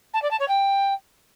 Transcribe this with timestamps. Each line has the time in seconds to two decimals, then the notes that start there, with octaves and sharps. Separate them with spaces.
0.14 A5
0.22 D5
0.31 A5
0.40 C#5
0.48 G5